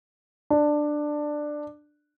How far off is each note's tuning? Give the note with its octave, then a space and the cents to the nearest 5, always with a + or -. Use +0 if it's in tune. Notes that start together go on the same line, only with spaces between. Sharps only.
D4 +10